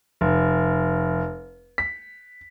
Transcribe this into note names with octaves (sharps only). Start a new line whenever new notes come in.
F1
B6